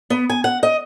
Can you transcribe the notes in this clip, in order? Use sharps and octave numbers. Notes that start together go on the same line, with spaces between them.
B3
G#5
F#5
D#5